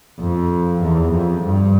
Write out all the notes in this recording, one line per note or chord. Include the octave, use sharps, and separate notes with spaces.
F2
E2
F2
G2